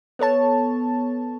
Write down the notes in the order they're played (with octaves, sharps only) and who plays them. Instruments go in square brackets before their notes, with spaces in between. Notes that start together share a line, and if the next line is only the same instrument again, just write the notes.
[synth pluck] B3 A4 C#5 A5